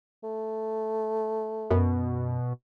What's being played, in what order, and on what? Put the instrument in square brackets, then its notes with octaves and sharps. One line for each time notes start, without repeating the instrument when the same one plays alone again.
[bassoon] A3
[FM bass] F#2 [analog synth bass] B2